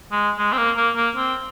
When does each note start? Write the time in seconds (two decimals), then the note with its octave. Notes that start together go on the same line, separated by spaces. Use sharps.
0.11 G#3
0.38 G#3
0.53 C4
0.58 A#3
0.76 A#3
0.96 A#3
1.16 C4